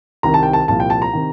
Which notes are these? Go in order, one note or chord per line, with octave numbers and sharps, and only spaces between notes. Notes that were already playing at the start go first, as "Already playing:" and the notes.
C2 C3 D#3 A#5
A5
G5
A5
C2 A#2 F3 A5
G5
A5
A#5
C3 D#3